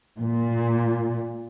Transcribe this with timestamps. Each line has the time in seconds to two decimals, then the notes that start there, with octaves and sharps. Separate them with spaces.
0.20 A#2